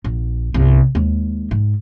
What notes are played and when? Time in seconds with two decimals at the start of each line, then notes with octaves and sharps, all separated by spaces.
0.04 A#1
0.54 G1 C2
0.95 D#2 G#3
1.51 G#2